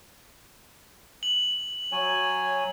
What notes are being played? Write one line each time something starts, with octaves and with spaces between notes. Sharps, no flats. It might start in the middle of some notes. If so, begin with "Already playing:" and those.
F#7
F#3 C#5 G#5